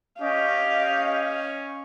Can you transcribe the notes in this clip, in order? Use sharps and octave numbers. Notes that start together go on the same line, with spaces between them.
C#4 G4 D#5 F5